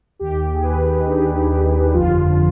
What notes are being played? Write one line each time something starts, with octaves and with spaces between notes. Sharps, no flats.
D#2 D#3 G4
G#4
B4
D#4
D4
G1 F2 D3 F3 F4